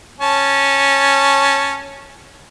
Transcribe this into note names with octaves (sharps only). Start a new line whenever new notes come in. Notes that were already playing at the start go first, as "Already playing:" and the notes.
C#4 A5